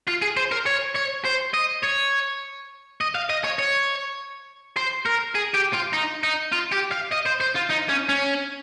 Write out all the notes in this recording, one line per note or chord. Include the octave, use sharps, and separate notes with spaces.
F4
G#4
C5
A#4
C#5
C#5
C5
D#5
C#5
D#5
F5
D#5
C#5
C#5
C5
A#4
G#4
G4
F4
D#4
D#4
F4
G4
F5
D#5
C5
C5
F4
D#4
C#4
C#4